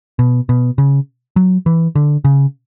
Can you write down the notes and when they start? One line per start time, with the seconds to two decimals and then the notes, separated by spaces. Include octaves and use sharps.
0.19 B2
0.49 B2
0.78 C#3
1.36 F#3
1.66 E3
1.95 D3
2.24 C#3